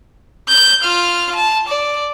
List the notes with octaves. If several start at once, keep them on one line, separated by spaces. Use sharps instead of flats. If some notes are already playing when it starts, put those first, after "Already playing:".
G6
F4 F6
A5
D5